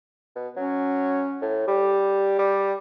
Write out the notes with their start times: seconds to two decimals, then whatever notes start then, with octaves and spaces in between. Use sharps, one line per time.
0.35 B2
0.56 F#3 C#4
1.41 A2
1.68 G3 G4
2.39 G3